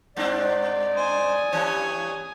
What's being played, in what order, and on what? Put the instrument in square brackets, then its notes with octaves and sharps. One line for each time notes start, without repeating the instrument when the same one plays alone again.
[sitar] G2 C4 D4 [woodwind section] D5
[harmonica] C5 [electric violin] G#5 D#6
[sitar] G2 E3 [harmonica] C#5